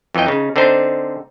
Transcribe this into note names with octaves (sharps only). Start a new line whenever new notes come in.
F2 E3 C#5 D#5 G5
C#3 D#4
D3 C4 D4 D#4 C5